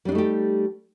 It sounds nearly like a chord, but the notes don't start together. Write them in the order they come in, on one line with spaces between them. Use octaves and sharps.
G3 D4 D#4 A3 G4